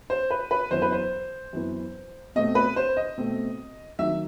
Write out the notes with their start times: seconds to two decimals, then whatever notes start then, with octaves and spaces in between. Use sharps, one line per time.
0.10 C5
0.31 B4
0.51 B4
0.71 F#2 E3 B3 C5
0.82 B4
0.92 C5
1.53 F#2 E3 B3
2.35 B2 A3 C4 D#5
2.55 B4
2.76 C5
2.97 D#5
3.18 B2 A3 C4
3.99 D#3 F#3 E5